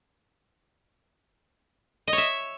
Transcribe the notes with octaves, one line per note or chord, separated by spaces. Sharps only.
D#5
C#5
E5